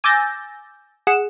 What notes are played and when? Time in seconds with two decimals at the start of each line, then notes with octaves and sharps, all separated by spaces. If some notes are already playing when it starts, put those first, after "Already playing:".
0.04 G#5 D6 E6 G6 A6 A#6
1.07 G#4 F#5 E7